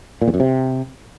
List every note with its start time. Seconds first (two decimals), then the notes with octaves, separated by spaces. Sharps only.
0.22 A#2
0.28 E2
0.34 F#2
0.40 C3